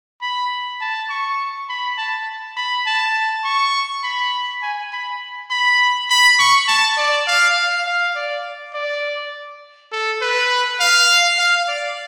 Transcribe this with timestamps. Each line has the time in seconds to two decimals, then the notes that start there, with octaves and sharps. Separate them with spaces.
0.21 B5
0.81 A5
1.10 C#6
1.69 B5
1.97 A5
2.57 B5
2.87 A5
3.44 C#6
4.03 B5
4.62 G#5
4.92 B5
5.50 B5
6.10 B5
6.39 C#6
6.68 A5
6.97 D5
7.27 F5
7.57 F5
7.86 F5
8.16 D5
8.74 D5
9.92 A4
10.21 B4
10.80 F5
11.39 F5
11.68 D5